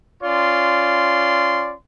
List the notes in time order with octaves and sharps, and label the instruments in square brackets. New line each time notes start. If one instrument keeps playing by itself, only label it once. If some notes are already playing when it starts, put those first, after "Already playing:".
[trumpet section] C#4 F4 D5 C6